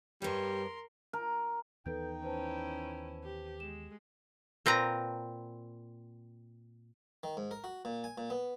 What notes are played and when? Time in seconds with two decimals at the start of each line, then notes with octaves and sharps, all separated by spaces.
0.22 G2 G3 A#4 C#5 C6
1.13 A#4
1.86 D#2 E3 B3 D#4 A4 B4 G5 G6
2.24 C#4 E4 B4 C5 A5
3.24 G4
3.60 G#3 E7
4.66 A#2 C4 B4 A#5
7.23 D#3
7.37 G#2
7.51 A#4
7.64 F#4
7.85 A#2
8.04 G#5
8.18 A#2
8.30 B3